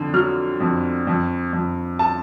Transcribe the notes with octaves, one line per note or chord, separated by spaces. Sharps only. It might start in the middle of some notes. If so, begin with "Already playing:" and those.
Already playing: F2 D3
F#3 F6
F2
F2
F2
A5